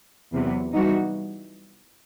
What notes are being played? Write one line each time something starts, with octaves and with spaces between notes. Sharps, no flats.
E2 C3 F#3 B3
E3 G3 D#4 F#4